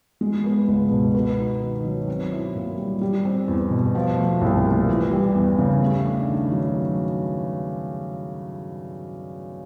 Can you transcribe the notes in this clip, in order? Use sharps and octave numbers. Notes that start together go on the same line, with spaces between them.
G#3
B3
C#2
B2
B3
D#4
D#3
F#3
C4
E4
A#2
G3
G3
C4
E2
B2
F3
A3
C2
A#2
E3
G3
E2
C#3
A3
D4
D#3
F#3